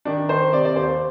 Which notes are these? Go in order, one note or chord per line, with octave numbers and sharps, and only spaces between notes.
D#3 D4
D#3 C5
C3 D5
D5
D#2 C5